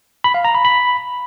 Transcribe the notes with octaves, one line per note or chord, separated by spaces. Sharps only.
B5
F5
A#5
B5
B5